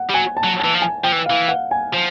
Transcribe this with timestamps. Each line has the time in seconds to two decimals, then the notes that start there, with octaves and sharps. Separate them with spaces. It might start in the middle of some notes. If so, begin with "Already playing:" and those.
Already playing: F#5
0.10 G3
0.14 F#3 G#5
0.37 A5
0.44 F#3
0.60 A5
0.64 E3
0.74 F3
0.82 G#5
1.04 F3 G5
1.12 E3
1.26 F5
1.30 E3
1.48 F#5
1.71 G#5
1.94 F3